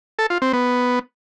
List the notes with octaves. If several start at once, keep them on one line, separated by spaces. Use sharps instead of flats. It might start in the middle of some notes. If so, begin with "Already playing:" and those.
A4
F4
C4
B3